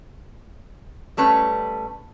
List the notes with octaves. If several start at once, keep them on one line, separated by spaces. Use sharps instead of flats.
G3 A3 C#4 B4